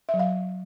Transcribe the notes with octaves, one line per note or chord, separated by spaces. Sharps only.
F#3 E5
F5